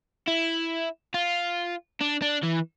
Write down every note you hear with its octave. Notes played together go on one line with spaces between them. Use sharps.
E4
F4
D4
D4
E3